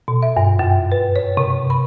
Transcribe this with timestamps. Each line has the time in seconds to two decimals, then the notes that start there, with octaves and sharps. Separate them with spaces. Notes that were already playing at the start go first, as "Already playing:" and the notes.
0.08 B2
0.23 E5
0.37 G2
0.59 F#2
0.92 B4
1.16 C#5
1.37 C3
1.70 B5